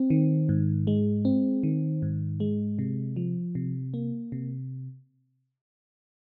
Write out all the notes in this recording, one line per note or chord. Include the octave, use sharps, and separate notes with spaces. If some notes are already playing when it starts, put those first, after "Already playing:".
Already playing: C4
D#3
G#2
G#3
C4
D#3
G#2
G#3
C3
F3
C3
A#3
C3